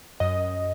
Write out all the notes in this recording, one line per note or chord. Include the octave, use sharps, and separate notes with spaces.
F#2 D#5